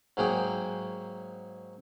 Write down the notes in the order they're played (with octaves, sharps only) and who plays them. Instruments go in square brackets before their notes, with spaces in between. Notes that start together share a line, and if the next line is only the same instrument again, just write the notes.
[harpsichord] G#2 F#3 A#3 F#4 G#4 G5